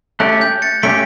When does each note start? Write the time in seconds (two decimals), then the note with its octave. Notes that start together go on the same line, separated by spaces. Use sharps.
0.20 A3 C#4 G4 F#6
0.41 G6
0.62 A6 C#7
0.83 A3 C#4 G4 B6 D7